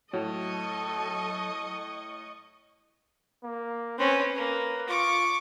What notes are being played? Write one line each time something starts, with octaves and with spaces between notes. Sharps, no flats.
A2 F#3 A4 D#5 C#6
A#3
C4 C#4 B4
A#3
F4 C#6 D6